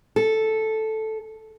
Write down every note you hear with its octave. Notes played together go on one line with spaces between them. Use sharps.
A4